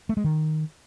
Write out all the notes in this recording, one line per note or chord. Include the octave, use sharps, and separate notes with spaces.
A3
G#3
D#3